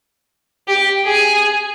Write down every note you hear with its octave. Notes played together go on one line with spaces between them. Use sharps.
G4
G#4